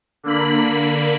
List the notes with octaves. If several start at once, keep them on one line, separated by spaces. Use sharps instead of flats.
D3 A#3 B5